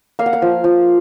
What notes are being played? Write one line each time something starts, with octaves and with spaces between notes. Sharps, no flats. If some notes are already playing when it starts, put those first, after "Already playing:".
A#3 F5
F#5
F5
F3
F3